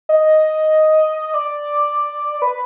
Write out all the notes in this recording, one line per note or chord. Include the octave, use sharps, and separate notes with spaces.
D#5
D5
B4